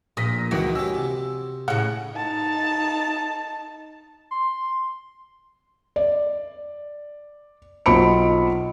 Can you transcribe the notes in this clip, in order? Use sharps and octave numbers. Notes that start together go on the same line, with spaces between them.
A#1 A#2 D#6 A#6 B6
C#2 D#3 E3 F#4 D#6
C#4 G4 E6
C3
A2 C#3 F#5
D#4 A5
C6
D5
B1 F4 C5 B5 C#7 D7